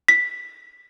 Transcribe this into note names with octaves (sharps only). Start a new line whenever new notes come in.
B6